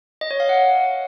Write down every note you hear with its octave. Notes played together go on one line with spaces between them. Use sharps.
D#5
C#5
F5
F#5